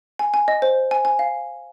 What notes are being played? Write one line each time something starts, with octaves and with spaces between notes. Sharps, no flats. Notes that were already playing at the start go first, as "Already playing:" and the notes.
G#5
G#5
D#5
C5
G#5
G#5
F5